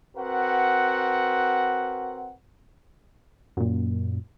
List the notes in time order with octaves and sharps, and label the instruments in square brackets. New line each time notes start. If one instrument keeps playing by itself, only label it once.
[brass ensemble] C4 F#4 A#4 B4 F#5
[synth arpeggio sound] F#2 A#2